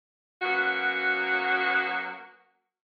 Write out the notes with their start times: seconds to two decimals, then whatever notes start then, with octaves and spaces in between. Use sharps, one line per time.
0.42 F#3 A#3 B3 C#4 F#4